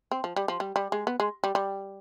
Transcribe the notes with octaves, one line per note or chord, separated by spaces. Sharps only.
C4
F3
G3
F3
G3
G3
G#3
B3
G#3
G3
G3